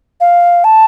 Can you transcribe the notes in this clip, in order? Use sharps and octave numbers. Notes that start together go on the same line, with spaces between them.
F5
A5